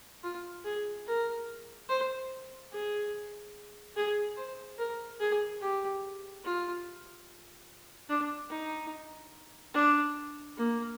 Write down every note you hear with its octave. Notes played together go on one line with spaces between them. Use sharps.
F4
G#4
A#4
C5
G#4
G#4
C5
A#4
G#4
G4
F4
D4
D#4
D4
A#3